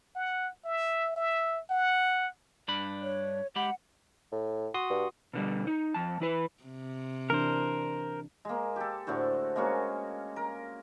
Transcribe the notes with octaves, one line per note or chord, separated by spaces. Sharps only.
F#5
E5
E5
F#5
G2 D4 B5
C#5
G#3 G4 F#5 B5
A2
F#4 C6 D#6
G2
B2 D3 G3
D#4
F2 A5
E3 E4 B4
C3
E3 D4 A#4 C5
G#3 A#3
G4 A4
A2 D3 F#4 C5
G#3 A#3 C#4 F#4
A#4